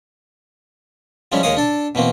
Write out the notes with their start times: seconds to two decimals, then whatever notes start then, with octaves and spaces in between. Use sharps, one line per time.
1.32 F3 G3 G#3 C#4 E4
1.43 D#2 G#3 A#4 C#5 F5 D#6
1.57 D4 A4
1.95 B2 E3 A#3 C4